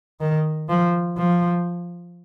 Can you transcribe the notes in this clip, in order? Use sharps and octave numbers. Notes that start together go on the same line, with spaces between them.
D#3
F3
F3